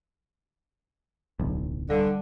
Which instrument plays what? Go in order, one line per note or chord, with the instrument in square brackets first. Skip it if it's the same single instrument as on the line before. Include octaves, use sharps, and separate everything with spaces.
[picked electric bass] D1 B1
[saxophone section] D3 [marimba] G3 A4 F5